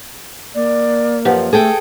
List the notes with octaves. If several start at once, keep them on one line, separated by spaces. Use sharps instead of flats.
A#3 D5
F#2 F3 G4 B4 F#5
A3 G#4 A4 G5